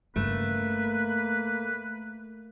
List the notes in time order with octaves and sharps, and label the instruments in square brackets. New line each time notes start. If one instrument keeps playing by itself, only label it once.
[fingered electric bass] G1 G2 C#3 [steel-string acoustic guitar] A3 [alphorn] A#3 [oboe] B4